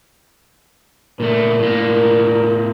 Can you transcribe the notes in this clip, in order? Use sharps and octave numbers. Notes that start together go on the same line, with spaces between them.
A#2 A3 D4 A#4
A2 A#3